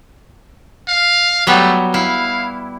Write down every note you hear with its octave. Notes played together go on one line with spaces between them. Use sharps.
F5
F#3 G3 A3 B3
E4 F5